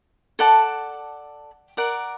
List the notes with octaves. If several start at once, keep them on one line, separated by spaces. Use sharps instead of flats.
A4 D5 F#5 A5
A#4 D5 F#5